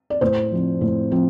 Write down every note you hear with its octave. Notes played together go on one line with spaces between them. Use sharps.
D5
A2 C5
F3 C4
A2
F3 C4